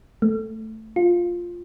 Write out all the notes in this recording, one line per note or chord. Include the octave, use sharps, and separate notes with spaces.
A3
F4